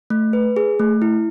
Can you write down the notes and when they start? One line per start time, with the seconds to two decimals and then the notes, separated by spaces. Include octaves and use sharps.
0.10 A3
0.33 B4
0.56 G#4
0.79 A3
1.02 E4